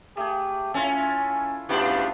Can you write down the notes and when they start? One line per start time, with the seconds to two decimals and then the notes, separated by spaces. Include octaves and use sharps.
0.17 A3 G4 G#4
0.74 C#4 E4 F4 A4 G#5
1.69 E2 F3 A3 B3 D4 G4